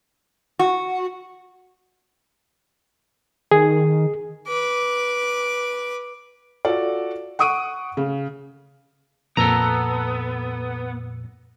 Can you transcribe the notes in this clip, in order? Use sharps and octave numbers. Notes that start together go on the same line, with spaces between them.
F#4
D#3 G#4
B4 D6
F4 F#4 A4 D5
F#5 C#6 D#6 D7 D#7
C#3
F2 A#2 B3 A4 A#5 E6